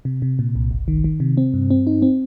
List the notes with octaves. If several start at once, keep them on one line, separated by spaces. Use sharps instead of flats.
C3
C3
A#2
C2
G1
D#3
D#3
C3
C4
G2
C4
D#4
C4